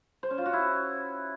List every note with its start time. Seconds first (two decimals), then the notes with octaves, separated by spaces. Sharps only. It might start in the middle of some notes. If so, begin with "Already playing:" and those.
0.23 C5
0.30 C#4
0.38 F4
0.46 F#4
0.53 E4